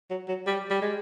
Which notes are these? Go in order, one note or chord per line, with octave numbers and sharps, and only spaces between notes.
F#3
F#3
G3
G3
G#3